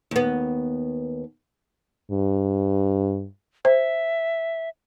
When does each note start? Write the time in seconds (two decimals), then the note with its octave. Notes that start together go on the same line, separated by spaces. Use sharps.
0.11 D#2 B3
2.11 G2
3.65 C5 E5